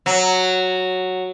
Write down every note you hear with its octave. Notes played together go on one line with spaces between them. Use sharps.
F#3